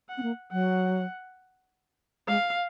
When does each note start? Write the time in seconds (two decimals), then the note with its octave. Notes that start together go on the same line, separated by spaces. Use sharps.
0.09 F#5
0.18 C4
0.23 A#3
0.52 F#3 F#5
2.28 G#3 F5